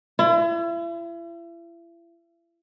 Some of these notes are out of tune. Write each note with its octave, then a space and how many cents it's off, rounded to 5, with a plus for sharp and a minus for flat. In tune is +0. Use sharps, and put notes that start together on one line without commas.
E4 +40